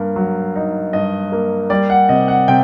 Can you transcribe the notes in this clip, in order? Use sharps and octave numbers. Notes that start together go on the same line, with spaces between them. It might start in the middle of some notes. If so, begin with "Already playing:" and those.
Already playing: G2 A#3
F#3
D#4
G2 D#5
A#3
G3 D5
F#5
C3 D#5
F#5
C3 G5